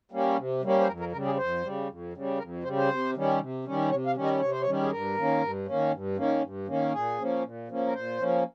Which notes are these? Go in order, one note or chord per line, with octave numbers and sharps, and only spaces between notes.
G3 A#3 C#4
C3
G3 A#3 C#4
C5
F2 A#4
A#4
C#3 G3 A#4
G#4
F2 C5
C#3 G3
F2
C#3 G3
F2 A#4
C#3 G3 C5
C5
C3
D#3 G3 C#4
C3
D#3 G3 C#4
C3 C#5
F5
D#3 G3 C#4
D#5
C3 C#5
C5
C#5
D#3 G3 C#4
G#4
G2 A#4
D#3 A#3 C#4
G2
D#3 A#3 C#4
G2
D#3 A#3 C#4
G2
D#3 A#3 C#4
A#2 G#4
F3 A#3 C#4
A#2
F3 A#3 C#4
A#4
A#2 C5
F3 A#3 C#4